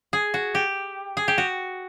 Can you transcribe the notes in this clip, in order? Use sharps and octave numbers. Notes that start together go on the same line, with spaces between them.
G#4
F#4
G4
G#4
G4
F#4